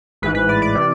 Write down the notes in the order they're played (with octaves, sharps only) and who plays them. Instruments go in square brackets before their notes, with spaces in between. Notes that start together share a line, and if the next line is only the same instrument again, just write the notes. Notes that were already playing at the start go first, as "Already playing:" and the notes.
[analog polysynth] A1 G#2 E3 B4
B4
D5
D5
C3 E3